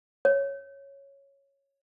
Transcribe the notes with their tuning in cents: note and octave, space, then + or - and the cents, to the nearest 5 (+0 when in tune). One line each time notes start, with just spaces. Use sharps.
C#5 -5